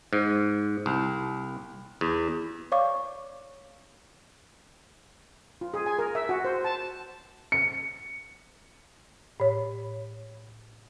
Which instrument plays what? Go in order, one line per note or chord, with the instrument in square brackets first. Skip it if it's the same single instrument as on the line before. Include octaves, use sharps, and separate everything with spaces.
[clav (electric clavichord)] G#2
C2
E2
[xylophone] C#5 D5 F5 C#6 D6
[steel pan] F4
G#4
G#5
A#4
E5
F#4
C5
A5
[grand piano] C#7
[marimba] A2 C#5